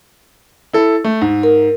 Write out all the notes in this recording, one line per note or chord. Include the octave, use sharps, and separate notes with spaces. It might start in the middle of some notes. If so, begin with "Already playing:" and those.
E4 A4
A3
G#2
A#4